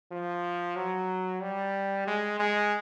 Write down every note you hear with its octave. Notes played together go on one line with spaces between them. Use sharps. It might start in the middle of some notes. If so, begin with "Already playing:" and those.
F3
F#3
G3
G#3
G#3